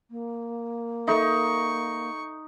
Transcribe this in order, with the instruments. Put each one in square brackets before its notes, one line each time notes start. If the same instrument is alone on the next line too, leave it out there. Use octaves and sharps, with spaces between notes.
[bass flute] A#3
[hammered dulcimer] D#4 [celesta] A4 E5 [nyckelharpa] C#6